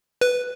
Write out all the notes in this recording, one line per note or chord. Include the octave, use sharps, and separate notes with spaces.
B4